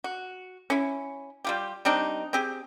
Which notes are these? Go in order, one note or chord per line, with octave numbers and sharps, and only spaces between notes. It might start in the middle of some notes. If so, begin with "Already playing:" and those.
F#4
C#4 E4
G3 F4 G4
G3 C4 D4 D#4
C4 G4 G#4